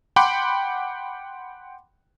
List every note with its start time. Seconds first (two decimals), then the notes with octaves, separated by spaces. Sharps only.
0.16 F#5 G5 B5 C6 D6